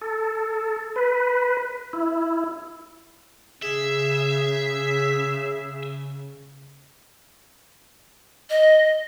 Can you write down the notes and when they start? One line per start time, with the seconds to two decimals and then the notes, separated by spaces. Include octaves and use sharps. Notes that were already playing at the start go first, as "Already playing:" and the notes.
0.01 A4
0.96 B4
1.93 E4
3.63 C#3 G#4 E5
8.50 D#5